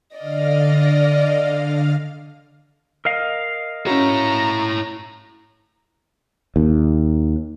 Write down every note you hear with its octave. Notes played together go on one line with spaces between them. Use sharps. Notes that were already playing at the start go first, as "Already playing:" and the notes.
D3 D5 D#5 F5 F6
A#4 D#5 F5
C#4 E4 F#4 C#5 A#5
D#2